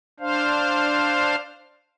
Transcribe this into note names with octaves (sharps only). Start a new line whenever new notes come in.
D4 C5 F5